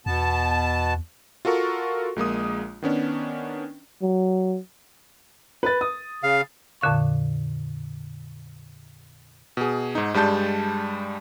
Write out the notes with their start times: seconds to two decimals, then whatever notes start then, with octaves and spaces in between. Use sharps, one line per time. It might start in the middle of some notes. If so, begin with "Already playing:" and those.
0.06 E2 B2 B3 A5
1.45 F4 F#4 A4 A#4 C#6
2.16 A#1 G#3 A#3 D#6
2.82 D#3 B3 C#4 D4
4.02 F#3
5.63 B4 A6
5.81 D#6
6.23 C#3 F5
6.81 F2 A#2 D3 F5 C#6
9.57 B2 G#4
9.95 G#2 D#4
10.14 G2 G3 G#3 A5 G6